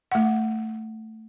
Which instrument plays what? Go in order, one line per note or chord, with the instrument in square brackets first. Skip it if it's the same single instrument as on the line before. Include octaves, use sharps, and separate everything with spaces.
[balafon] A3 F#5